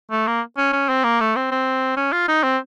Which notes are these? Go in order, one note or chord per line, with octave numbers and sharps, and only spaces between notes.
A3
A#3
C#4
C#4
C4
A#3
A3
C4
C4
C#4
F4
D#4
C4